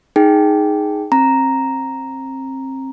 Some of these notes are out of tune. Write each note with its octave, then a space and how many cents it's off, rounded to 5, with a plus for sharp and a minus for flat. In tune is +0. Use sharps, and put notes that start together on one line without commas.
D#4 +0 G#4 +0 G5 +0
C4 +30 A#5 +0